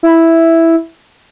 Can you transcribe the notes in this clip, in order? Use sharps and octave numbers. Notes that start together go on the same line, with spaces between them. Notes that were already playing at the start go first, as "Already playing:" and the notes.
E4